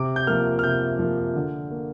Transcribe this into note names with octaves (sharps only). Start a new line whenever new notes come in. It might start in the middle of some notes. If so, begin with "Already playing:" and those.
Already playing: C3 D6
G6
F3 A#3 F6
F6
C3 G6
F3 A#3
D3
A#3